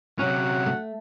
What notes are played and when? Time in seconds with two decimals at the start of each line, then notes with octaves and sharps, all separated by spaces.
0.19 C3 F#3 C#4 F#4 F#5
0.66 A3